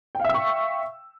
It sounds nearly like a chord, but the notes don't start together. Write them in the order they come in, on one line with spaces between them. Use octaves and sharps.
G5 F5 E5 E6 C#6